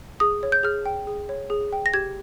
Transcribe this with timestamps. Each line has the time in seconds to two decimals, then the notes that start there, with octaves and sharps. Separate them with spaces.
0.20 G#4 D#6
0.43 C#5
0.52 G6
0.63 G#4 F6
0.86 G5
1.07 G#4
1.29 C#5
1.50 G#4
1.73 G5
1.86 A#6
1.94 G4 G#6